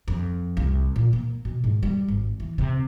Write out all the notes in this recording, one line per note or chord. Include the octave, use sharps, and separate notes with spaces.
F2
C2
A#2
A#3
B2
G#2
G3
G#1
E3
C3